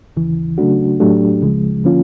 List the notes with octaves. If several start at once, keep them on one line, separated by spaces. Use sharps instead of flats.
D#2 C#3 E3
C#3 F#3 A3 D4 F#4
A2 F#3 A3 D4 G4
C#2 C#3 F3 G#3
D3 F3 A#3 C#4 F4